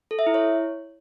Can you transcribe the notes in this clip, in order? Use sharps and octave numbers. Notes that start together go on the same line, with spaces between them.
A4
E5
E4
C#5